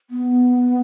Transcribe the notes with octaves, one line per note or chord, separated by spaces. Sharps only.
B3